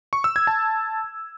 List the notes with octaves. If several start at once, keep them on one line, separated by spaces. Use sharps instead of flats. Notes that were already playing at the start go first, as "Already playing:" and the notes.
C#6
E6
G#6
A5